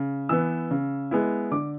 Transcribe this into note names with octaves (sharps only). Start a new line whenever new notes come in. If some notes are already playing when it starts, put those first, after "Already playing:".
Already playing: C#3
E3 B3 E6
C#3
G#3 B3 E4
D3 D6